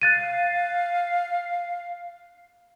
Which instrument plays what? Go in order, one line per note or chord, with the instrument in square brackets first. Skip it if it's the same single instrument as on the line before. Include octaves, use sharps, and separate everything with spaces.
[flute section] F5 [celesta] F#6 A6 D#7